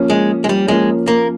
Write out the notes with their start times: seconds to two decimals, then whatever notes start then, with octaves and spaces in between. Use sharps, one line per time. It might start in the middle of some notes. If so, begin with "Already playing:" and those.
Already playing: F3 A#3 C#4
0.10 G#3
0.44 G#3
0.49 G3
0.68 F3 G#3 A#3 C#4
1.08 A#3